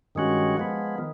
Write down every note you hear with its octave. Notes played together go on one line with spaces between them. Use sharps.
G2 D#3 G#3 C#4 F#4
F3 G#3 B3
D#3